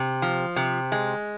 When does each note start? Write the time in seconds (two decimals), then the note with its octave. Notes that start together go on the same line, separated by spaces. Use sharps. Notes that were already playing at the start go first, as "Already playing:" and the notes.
Already playing: C3
0.22 F3
0.56 C3
0.92 G#3